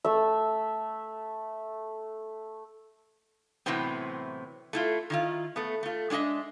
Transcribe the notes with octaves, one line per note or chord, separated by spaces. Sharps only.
A3 E5
A2 C3 E3 F#3 B3 C4
A3 E4 F4
D#3 E4 F4
A3 B3
A3 F4
G#3 D4 E4 D#5 E5